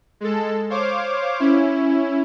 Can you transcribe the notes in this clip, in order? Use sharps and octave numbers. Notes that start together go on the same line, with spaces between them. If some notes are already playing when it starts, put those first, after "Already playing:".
G#3 A4
C5 C#5 F5 D6
C#4 E4